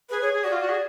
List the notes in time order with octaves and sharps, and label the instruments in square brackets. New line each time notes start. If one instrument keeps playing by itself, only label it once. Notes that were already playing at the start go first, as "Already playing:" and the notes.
[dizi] G#4 [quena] B4
[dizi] G#4 [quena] C#5
[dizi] G#4
[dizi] F#4 [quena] D5
[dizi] F4
F#4
G#4